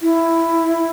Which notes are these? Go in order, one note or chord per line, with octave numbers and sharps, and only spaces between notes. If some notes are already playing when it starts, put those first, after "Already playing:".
E4